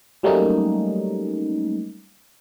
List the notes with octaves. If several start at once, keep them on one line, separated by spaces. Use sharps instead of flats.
F#3 G3 A3 A#3 C#4 D#4